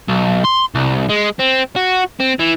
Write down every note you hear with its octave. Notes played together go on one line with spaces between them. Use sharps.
B1
C6
C2
G#3
C4
F#4
C4
E3